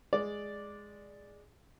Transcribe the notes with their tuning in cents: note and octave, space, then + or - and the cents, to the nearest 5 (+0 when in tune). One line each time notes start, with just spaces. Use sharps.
G#3 +0 D5 +0